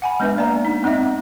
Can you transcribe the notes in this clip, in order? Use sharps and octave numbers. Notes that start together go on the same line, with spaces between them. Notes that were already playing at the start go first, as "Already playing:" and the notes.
F#5 G#5 B5
G#3 B3 D4 B4 E5
A#3 D5 A#5
D#4
B3 C4 D#4 D#5 E5